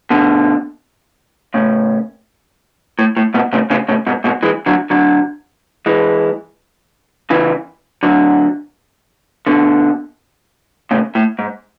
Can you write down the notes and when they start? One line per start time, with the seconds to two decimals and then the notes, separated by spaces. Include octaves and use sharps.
0.10 B2 D3
1.54 A2 C#3
2.99 A2
3.17 A2
3.34 G#2 B2
3.53 A2 C#3
3.70 A2 C#3
3.88 A2 C#3
4.07 G#2 B2
4.24 G#2 B2
4.43 E3 G#3
4.66 D3 F#3
4.90 D3 F#3
5.86 E3 G#3
7.30 C#3 E3
8.03 D3 F#3
9.47 B2 D3
10.91 A2 C#3
11.15 A2
11.39 G#2